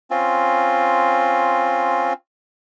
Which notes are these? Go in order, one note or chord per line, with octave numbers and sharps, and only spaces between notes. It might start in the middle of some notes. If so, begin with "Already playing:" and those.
C4 C#4 F4